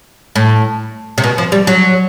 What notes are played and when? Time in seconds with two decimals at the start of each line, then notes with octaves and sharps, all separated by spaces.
0.36 A2
1.18 C3
1.24 B2
1.38 F3
1.52 G3
1.67 F#3